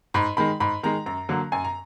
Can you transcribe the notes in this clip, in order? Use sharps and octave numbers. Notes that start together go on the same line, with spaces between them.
G#2 B5
D#3 G#3 B5
G#2 B5
D#3 G#3 A#5
F#2 A#5
D3 F#3 A#3
F#2 G#5
A#5